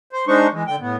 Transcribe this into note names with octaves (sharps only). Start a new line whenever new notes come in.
C5
G#3 D4 D#4 C5 C#6
E3 G#3
D3 G5
A2 B3